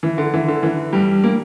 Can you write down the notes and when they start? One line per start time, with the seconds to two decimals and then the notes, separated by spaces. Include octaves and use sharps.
0.03 E3
0.18 D3
0.34 E3
0.48 D3
0.63 E3
0.93 G2 G3
1.24 A#3